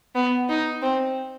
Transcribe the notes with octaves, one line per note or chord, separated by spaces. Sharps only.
B3
D#4
C4